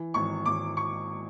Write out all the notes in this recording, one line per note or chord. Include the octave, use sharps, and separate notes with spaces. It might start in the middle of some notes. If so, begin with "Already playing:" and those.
Already playing: E3
G#1 C#6
G#1 D6
C#6